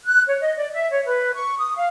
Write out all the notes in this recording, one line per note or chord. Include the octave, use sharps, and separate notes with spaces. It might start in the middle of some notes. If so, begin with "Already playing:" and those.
F#6
C#5
D#5
D5
E5
C#5
B4
C#6
D#6
F5